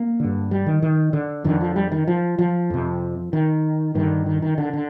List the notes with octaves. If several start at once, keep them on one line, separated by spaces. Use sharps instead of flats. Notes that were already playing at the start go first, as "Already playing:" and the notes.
Already playing: A#3
G2 D3
G3
D#3
D#3
D3
F2 D3 D#3
F3
G3
D#3
F3
F3
F2 C3
D#3
G2 D3 D#3
D#3
D#3
D3
D3